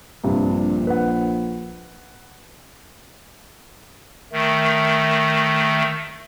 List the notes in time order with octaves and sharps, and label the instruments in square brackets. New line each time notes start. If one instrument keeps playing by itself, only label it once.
[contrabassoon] A#1 [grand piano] G2 C3
[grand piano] B4 F#5
[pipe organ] D#3 A3